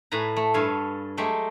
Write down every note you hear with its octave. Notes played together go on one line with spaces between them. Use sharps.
A2 B4 G#5 A#5
A3
G2 A4 C#5 F5 G#5
F#3 G#3 A3 G4